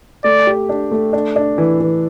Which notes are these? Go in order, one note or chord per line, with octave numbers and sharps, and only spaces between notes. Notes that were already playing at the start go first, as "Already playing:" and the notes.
A3 D5
G4
D4
A3
D4
D4
E3
E3